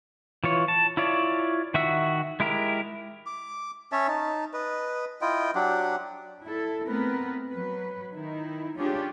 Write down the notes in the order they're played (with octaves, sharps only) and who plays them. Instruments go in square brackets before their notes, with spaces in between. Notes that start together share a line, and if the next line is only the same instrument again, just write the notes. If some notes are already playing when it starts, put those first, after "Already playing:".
[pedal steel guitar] E3 F4 C#5
A5
E4 F4 C#5 D5
D#3 F#4 E5 F#5 E6
G#3 E4 G4 A#4
[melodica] D6
C#4 C#5 E5 A5
D#4 A5
B4 D#5
E4 F4 D#5 G5
F#3 D4 G4 F#5
[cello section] E4 A4
A3 B3 C4 A#4 B4
F#3 B4
D#3 D#4 E4
C#4 D4 F4 G4 G#4